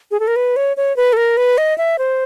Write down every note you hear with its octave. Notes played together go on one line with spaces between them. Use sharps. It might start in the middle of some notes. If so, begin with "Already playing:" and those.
G#4
A4
A#4
B4
C#5
C#5
B4
A4
A#4
B4
D#5
E5
C5